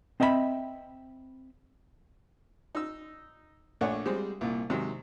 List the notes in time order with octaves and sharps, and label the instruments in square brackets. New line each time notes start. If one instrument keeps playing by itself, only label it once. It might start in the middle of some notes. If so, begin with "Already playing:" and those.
[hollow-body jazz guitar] C4 D#5 E5 F#5 B5
[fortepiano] D#4 E6
A#1 A3 D4 C#5 F#5
G3 G#3 C4 C5
C2 A#2
G#2 C3 D#3 F#3